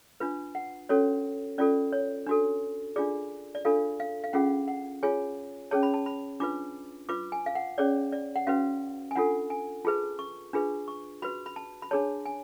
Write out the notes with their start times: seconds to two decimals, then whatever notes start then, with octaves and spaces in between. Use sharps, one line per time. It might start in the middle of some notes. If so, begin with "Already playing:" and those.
0.20 D4 F4 B4
0.55 F#5
0.89 C#4 F#4 A4 C#5
1.58 C#4 F4 A4 D5
1.93 C#5
2.27 D4 F#4 A4
2.96 D4 F4 G#4 D5
3.55 D5
3.65 D4 F4 A4 F5
4.00 F5
4.24 F5
4.33 C#4 F4 G#4 F#5
4.68 F#5
5.03 F4 G#4 C#5 G#5
5.71 C#4 G#4 C#5 A5
5.83 B5
5.94 A5
6.06 B5
6.40 D4 F4 B4 D6
7.09 F4 B4 D6
7.32 G#5
7.46 F5
7.55 F#5
7.78 C#4 G#4 C#5 D5
8.12 D5
8.36 F#5
8.47 C#4 F#4 B4 F5
9.11 G#5
9.16 D4 F4 A4 F#5
9.50 G#5
9.85 F4 G#4 B4 A5
10.19 C#6
10.53 D4 F4 G#4 B4
10.88 C#6
11.22 F#4 B4 B5
11.46 B5
11.56 A5
11.82 B5
11.91 D4 G#4 C#5 A5
12.26 G#5